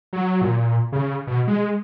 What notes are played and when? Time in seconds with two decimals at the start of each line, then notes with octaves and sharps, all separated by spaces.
0.13 F#3
0.42 A#2
0.92 C#3
1.27 B2
1.48 G#3